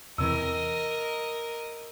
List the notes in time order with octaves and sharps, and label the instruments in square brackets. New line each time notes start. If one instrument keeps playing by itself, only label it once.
[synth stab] E2 C3 E3 [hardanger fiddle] A#4 D#5 [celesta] E6